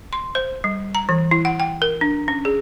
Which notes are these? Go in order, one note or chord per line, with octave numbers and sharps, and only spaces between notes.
C6
C5
G3
A#5
E3
E4
F#5
G5
A#4
D4
C#4
G#4